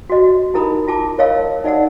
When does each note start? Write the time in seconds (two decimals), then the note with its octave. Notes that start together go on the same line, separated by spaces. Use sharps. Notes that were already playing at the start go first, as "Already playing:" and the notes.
0.09 F#4 D#5
0.54 D#4 E4 A#4 A#5 B5 D#6
0.88 F4 A5 D6
1.18 A#4 C#5 D#5 F5 E6
1.64 D#4 D5 D#5 F#5 E6